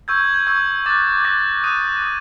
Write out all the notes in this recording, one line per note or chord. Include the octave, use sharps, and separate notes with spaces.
C#6 E6 G6 G#6
G#6
G6
C#6 E6 G6 G#6
D6 F#6 A6
D6 F#6 A#6
D#6 F#6 D#7
D#6 F#6